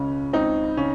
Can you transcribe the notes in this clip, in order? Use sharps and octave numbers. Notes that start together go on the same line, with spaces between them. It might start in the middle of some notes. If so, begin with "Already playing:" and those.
Already playing: C#2 C#3 C#4
C#2 C4 D#4
C#3 C#4